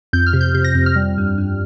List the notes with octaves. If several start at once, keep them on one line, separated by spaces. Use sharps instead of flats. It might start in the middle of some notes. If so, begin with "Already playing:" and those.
F2 G6
F6
C3
G6
C3 G6
A#6
F2
F6
G3
G2
G2